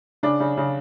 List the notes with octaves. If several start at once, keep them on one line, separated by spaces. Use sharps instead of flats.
C#3 D4
C#3
C#3